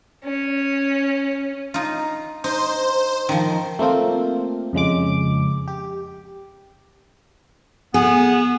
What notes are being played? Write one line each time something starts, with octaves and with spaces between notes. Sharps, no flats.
C#4
D#4 F4
D#4 C5
D#3 F3
A3 A#3 C4 F4
F2 C#3 G#3 D6
G4
B3 G#4